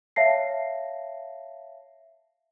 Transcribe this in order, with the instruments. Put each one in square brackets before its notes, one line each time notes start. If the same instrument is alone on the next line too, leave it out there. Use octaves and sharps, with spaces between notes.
[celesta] C#5 E5 F5 A5 A#6 C7